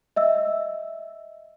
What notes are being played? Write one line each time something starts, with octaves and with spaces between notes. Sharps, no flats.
D#5 E5 E6